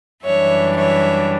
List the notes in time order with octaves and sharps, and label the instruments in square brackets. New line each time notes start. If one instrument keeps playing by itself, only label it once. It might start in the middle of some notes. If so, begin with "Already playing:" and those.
[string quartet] F#2 E3 G3 D4 C#5 E5
C#5 E5